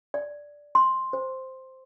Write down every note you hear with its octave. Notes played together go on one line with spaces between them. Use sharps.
D5
C6
C5